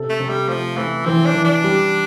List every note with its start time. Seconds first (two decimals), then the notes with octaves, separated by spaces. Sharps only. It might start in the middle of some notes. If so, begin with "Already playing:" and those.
Already playing: C3 A4
0.09 A3
0.20 C3
0.29 G3
0.48 F3 A3
0.77 E3 A3
1.06 E3 C4
1.25 D4
1.34 E3
1.45 D4
1.64 G3